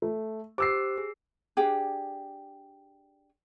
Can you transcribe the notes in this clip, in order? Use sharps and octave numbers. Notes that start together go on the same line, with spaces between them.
A3
G4 C5 D6 E6 C7
G#4
D4 G4 G#4